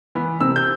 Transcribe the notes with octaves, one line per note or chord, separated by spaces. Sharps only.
E3 B3
C3 E6
G6